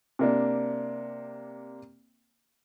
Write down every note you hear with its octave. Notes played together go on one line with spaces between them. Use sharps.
C3 A#3 D4